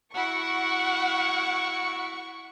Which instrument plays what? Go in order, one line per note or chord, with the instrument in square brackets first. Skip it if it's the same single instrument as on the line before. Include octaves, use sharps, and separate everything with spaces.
[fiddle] E4 F#4 [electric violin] F#5 [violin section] C#6